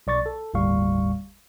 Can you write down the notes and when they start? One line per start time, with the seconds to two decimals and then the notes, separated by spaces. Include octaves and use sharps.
0.07 B1 D5 C#6 A6
0.26 A4
0.54 G1 D#2 A2 G3 F5 C#6